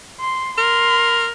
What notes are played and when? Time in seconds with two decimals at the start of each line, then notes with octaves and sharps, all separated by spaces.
0.20 C6
0.58 A#4 C6